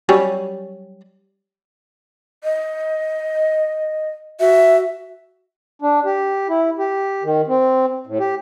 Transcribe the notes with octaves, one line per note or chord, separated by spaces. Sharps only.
F#3 G3 C#4
D#5
F#4 E5
D4
G4
E4
G4
D#3
C4
A2
G4